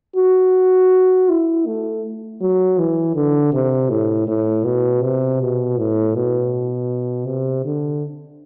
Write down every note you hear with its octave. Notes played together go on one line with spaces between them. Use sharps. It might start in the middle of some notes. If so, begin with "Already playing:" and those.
F#4
E4
A3
F#3
E3
D3
C3
A2
A2
B2
C3
B2
A2
B2
C3
D3